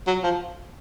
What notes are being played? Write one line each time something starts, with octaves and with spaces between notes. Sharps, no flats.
F#3
F3